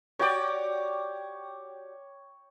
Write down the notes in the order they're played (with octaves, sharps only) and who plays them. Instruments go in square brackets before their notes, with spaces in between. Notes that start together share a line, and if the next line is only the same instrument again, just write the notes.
[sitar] F#4 G4 D5 [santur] C#5 G5 D6